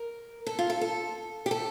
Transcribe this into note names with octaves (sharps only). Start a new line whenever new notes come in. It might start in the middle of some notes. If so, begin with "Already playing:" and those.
Already playing: A#4
A4
F4
A4
A4
G4
A4